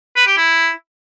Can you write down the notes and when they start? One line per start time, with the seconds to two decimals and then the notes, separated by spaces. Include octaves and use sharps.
0.16 B4
0.26 G4
0.37 E4